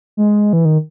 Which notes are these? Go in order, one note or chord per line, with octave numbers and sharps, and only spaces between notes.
G#3
E3
D#3